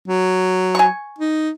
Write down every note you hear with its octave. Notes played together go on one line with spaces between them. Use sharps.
F#3
G#5 C#6
D#4